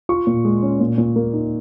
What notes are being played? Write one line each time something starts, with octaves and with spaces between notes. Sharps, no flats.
F4 C#6
A#2
G#3
C#4
A#2
A#2
A#3
D#4